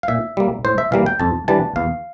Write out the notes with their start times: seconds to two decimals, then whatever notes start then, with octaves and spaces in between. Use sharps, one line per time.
0.03 F5
0.08 A#2 E5
0.37 G3 A#3
0.65 A2 C5
0.78 E5
0.92 E3 G3 A#3 F5
1.06 G5
1.20 F2 A5
1.48 E3 G3 D4 A5
1.76 E2 F5